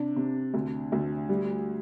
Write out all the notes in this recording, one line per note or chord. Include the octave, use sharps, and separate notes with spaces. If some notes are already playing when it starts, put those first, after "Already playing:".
Already playing: C3 D4
C3
D2
D2
G3